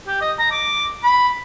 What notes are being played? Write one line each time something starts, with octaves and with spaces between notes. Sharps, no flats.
G4
D#5
A#5
D6
B5